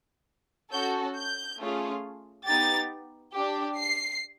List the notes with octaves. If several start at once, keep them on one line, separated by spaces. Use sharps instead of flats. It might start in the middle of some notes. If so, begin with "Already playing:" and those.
C#4 F#4 A4 G6
G6
A3 C#4 F4 G#4
B3 D#4 G4 A6
D4 G4
C7